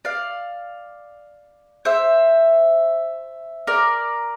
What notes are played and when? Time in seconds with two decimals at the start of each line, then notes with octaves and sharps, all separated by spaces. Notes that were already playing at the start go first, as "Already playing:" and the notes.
0.05 D5 F5
1.85 C5 E5
3.67 A#4 D5